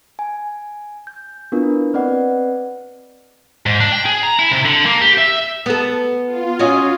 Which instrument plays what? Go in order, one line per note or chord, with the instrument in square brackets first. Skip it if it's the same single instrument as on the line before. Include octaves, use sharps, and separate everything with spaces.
[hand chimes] G#5
G6
B3 D4 E4 F4 A#4 B4
C4 B4 D5 D#5 F#5
[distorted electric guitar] G#2
D4
G5
G#4
A#5
E4
C3
D3
A#3
G4
E5
[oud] B3 A4
[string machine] F4
[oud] C#4 F#4 D#5